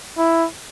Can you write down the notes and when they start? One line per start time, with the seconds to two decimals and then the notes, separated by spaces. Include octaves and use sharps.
0.18 E4